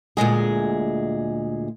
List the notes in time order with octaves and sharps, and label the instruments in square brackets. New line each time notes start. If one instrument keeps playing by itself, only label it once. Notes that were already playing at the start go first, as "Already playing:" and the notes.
[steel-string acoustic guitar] D2 A#2 G#3 G#4